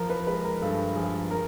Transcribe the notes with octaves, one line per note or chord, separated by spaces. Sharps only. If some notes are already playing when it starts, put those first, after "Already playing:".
Already playing: F3 A#4
B4
G#3 B4
A#4
G2 A4
F3 G#4
A#4